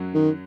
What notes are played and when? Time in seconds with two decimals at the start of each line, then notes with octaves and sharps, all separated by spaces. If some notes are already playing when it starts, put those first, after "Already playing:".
Already playing: F#2 F#3
0.14 D#3